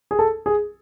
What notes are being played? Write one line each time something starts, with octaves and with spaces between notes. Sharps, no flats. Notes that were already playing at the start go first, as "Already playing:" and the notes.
G#4
A4
G#4